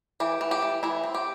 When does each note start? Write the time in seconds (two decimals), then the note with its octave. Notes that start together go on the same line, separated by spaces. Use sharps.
0.20 E3 G4
0.41 E3
0.51 G4
0.62 E3
0.83 E3 E4
1.03 C4
1.14 G4